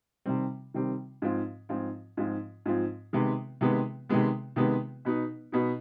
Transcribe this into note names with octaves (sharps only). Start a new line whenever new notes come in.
C3 D#3 G3 C4
C3 D#3 G3 C4
G#2 F3 C4 F4
G#2 F3 C4 F4
G#2 F3 C4 F4
G#2 F3 C4 F4
C3 D#3 G#3 B3
C3 D#3 G#3 B3
C3 D#3 G#3 B3
C3 D#3 G#3 B3
B2 B3 D#4
B2 B3 D#4